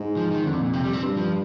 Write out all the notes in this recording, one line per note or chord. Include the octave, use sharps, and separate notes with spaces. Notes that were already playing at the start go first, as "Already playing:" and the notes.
Already playing: G#2
F3
D#3
F2 D3
A#2
C3
G3
C4
G2
F3